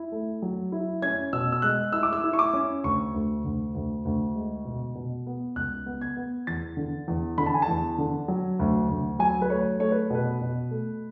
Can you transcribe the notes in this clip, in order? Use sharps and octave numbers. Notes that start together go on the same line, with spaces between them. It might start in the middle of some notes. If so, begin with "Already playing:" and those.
Already playing: E4
A3
F#3
E4
C#4 G#6
B2 E6
E6
G#3 F#6
E4 E6
D6
E6
E4
C#6
D6
C#4
D2 C#6
D2
D2
D2
D2
G#3
B2
B2
B3
C#2 F#6
B3
G#6
B3
E2 A6
D3
E2
D3 B5
A5
G#5
A5
E2
D3
F#3
D2
D2
F#3 G#5
B4
A3 C#5
A3 C#5
B4
B2 B4
B2
A3